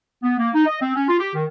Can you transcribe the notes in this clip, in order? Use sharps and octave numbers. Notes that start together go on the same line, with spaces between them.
B3
A#3
D#4
D#5
C4
C#4
F4
G4
D#3